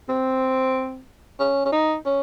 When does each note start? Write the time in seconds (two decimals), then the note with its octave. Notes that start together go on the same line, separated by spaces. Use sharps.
0.09 C4
1.40 C#4
1.66 C#4
1.72 D#4
2.06 C#4